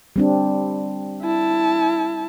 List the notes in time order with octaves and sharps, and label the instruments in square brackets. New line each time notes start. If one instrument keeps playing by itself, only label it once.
[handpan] G3 C4 D4
[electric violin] E4 A5